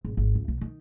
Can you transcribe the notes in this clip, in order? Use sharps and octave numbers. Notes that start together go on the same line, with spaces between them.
G#1
G#1
C#2
B1
D#3